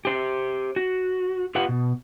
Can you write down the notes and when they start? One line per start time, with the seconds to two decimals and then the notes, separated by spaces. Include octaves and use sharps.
0.05 G4 C5
0.76 F#4
1.55 F4 G4 B4 F#5
1.69 B2